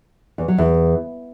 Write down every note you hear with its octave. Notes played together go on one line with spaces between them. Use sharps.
E2
F#3
E2